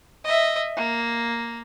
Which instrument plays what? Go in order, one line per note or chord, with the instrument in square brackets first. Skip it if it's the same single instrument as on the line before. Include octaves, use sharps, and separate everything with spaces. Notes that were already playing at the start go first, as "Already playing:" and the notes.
[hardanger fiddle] D#5 E5
A#3